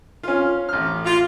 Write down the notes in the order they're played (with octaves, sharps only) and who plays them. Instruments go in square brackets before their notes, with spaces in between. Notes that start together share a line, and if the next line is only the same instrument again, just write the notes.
[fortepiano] C#4 F4
A1 F6
[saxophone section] F4